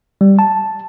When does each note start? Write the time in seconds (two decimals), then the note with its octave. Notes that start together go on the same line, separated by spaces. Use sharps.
0.21 G3
0.39 A5